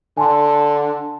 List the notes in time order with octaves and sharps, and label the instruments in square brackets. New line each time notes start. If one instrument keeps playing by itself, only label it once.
[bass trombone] D3 [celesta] G#5 A5 C6